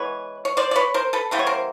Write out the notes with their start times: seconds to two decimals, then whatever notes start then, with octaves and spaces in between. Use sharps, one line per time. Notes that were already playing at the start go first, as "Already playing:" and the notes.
Already playing: E3 G#3 B3 B4 C#5
0.45 C#5
0.57 C5 D5
0.71 D5
0.75 B4 C#5
0.94 A#4 C5
1.13 A4 B4
1.31 C#3 E3 G3 B3 C5
1.39 C#5
1.47 A#4 C5